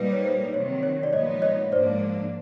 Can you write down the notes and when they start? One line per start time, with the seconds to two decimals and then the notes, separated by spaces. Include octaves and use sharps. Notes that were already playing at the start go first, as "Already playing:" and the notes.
Already playing: A#2 G3 A#3 D#4 B4
0.12 C#5
0.24 C5
0.53 C3 D#3 F#3 C#5
0.83 C#5
1.03 D5
1.13 A#2 F3 G#3 B3 D#4 C#5 D#5
1.42 C#5 D#5
1.72 G#2 F3 A#3 D4 C5 D5